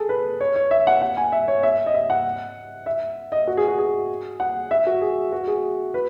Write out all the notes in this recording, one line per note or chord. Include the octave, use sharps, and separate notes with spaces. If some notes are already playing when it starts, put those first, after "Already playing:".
Already playing: G#4 A4
B4
C#5
C#5
E5
F#5
F#5
G#5
E5
C#5
E5
D#5
E5
F#5
E5
D#5
F#4
G#4
F#4
G#4
F#5
E5
F#4
G#4
F#4
G#4
B4